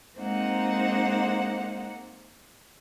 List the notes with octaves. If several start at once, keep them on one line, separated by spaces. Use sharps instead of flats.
G#3 A#3 C4 D#4 C5 F#5